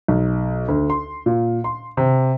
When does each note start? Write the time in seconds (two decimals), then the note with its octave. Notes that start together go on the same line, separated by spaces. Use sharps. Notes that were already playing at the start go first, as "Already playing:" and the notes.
0.08 B1
0.68 D2
0.90 C6
1.26 A#2
1.64 C6
1.97 C3